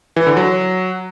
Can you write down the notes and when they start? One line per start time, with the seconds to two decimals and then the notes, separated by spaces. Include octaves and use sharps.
0.16 E3
0.27 D3
0.37 F#3